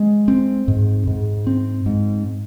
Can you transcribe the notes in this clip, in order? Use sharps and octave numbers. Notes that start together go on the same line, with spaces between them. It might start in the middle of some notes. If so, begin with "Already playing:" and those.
Already playing: G#3
C4
G#2
G#2
C4
G#2